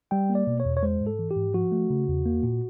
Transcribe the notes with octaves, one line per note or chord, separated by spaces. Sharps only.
G3 G5
A#3
D5
B2
C#5
E2
C#5
G#3 C5
G#2
A4
E3
G4
G#2
F3 F#4
A3
C#3
E2
A#3
A#2